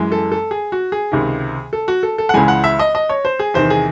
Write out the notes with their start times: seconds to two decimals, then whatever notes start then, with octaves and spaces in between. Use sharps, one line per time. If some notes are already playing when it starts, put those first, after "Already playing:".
Already playing: F#2 E3 G#3
0.12 A4
0.32 A4
0.51 G#4
0.72 F#4
0.92 G#4
1.12 C#2 C3 D#3
1.73 A4
1.88 F#4
2.03 A4
2.18 A4
2.29 F#5
2.34 C#2 C#3 E3 G#3 G#5
2.48 F#5
2.64 E5
2.79 D#5
2.95 D#5
3.09 C#5
3.25 C5
3.39 G#4
3.54 E2 C3 D#3 C5
3.70 G#4